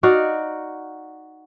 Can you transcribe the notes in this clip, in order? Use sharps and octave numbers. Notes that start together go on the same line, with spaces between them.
D#4 F#4 D5 F5